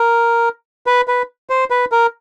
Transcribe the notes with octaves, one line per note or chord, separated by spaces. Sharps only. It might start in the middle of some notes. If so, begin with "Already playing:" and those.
Already playing: A#4
B4
B4
C5
B4
A#4